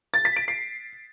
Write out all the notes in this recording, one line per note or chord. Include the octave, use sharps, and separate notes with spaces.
A6
B6
D7
C7